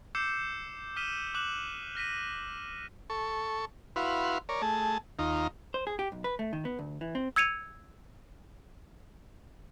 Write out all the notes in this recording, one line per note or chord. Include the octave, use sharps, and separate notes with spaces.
D6 E6 G6 C7 C#7 E7
D#6 F6 B6 D#7 E7 G7
D6 F#6 E7 F#7
F6 A#6 B6 D#7
A4 C#6
E4 F#4 B4 F5 C6
A#4 C#5 D5
A3 G#4 A5
D#2 D#4 F4 A#5
C5
G#4
G4
B1
B4
A3
D#3
B3
D2
E3
C4
E6 G#6 C#7 D#7 F7